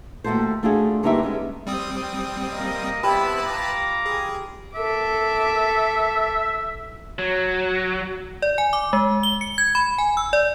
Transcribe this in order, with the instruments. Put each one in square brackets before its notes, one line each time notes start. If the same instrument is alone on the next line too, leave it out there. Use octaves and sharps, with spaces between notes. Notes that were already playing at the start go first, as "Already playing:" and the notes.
[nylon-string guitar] D#2 A3 F#4 A4 C5
A3 D4 F4 F#4 G#4
G2 D3 A#3 D#4 G4 E5
G#3 B3 C#4
[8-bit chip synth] G3 C4 D#6
[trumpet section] A#3 A#4 D#5
[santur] G3 [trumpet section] B3 C4 E4 [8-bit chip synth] B4 A5 B5
[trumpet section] F4 A#5 D6
[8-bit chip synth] G#4
[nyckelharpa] A4 D6 [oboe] E5
[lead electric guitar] F#3
[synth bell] D5
G#5
D6
G#3
G7
C#7
G#6
B5
G#5
E6
D5